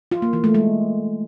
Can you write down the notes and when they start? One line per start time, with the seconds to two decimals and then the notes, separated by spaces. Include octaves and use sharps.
0.12 F4
0.22 A#3
0.33 E3
0.44 A3
0.55 G#3